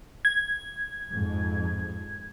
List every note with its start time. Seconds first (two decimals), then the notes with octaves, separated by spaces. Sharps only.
0.25 G#6
1.10 F2 G#2